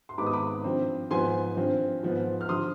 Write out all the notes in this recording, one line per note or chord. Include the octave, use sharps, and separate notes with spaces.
C6
G#2 D#3 G#3 B3 B5 D6
D#6
B5 D6
G2 F3 C4
G#2 F3 B3 G#5 C6
G2 F3 C4
G#2 F3 B3
F6
D3 F3 C6 D#6